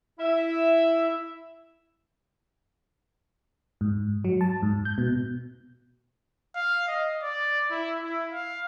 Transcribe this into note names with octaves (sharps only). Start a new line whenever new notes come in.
E4 E5
G#2
F#3
A5
G#2
G6
B2
F5
D#5
D5
E4
E4
F5